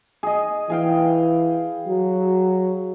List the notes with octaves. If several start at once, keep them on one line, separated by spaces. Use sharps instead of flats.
G#4 D#5
E3 G#4 F5 G5
F#3